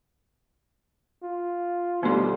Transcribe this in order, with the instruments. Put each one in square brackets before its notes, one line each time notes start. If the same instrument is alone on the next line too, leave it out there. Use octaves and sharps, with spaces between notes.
[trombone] F4
[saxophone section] D#2 F3 G3 [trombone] B2 [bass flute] A3 [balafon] B3 D4 C6